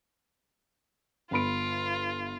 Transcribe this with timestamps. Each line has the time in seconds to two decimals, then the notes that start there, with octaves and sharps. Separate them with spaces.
1.31 G1 F4 B5 D7